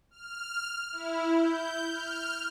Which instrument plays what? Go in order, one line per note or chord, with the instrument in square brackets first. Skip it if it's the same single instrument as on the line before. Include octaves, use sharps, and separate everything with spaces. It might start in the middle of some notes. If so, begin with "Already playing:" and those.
[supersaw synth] F6
E4
G6
F6